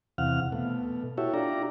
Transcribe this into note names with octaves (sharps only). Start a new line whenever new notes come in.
E2 C3 F5 F#5 F6
B2 A3
E4 F#4 G4 A4 C#5 E5
D4 F4 G4 D5 A#5